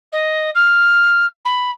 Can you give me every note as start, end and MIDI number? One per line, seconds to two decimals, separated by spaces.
0.12 0.50 75
0.55 1.26 89
1.45 1.70 83